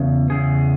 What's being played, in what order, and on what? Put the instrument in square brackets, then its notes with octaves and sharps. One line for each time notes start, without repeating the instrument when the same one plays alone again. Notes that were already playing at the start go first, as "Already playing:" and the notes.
Already playing: [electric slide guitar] E2 C#3
E2 C#3 G#4